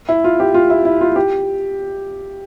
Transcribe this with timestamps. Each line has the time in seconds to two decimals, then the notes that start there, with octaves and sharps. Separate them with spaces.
0.09 E4
0.24 F4
0.40 G4
0.54 F4
0.70 E4
0.85 E4
1.01 F4
1.16 G4